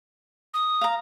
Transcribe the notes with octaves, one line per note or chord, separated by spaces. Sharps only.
D#6
F5 A#5